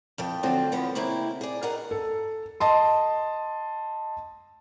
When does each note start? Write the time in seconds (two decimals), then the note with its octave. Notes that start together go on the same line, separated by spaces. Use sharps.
0.18 F2 F3 G5
0.43 D3 F#3 C4 D4 F4 A4
0.72 D3 F3 B3 C#4
0.95 C#3 G#3 A#3 C4 E4
1.41 G#4 D5
1.63 G2 G#4 A#4 D#5 F#5
1.91 A4
2.60 D#5 A5 C6